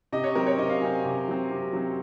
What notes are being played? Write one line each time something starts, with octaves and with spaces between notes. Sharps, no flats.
C3 D#5
C#5
F#3 C4 A#4
C#5
C3 D#5
F5
F#3 C4 G#5
G#5
C3
F#3 C4
C3
F#3 C4